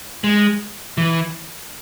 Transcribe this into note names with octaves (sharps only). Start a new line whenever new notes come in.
G#3
E3